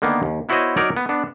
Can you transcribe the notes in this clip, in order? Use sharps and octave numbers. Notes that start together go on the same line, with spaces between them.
D3 D#3 A#3 B3
D#2
B3 E4 F#4 C5 C#5 D#5
F#3 D#4 A#4 C#5 D5
B3
B3 D4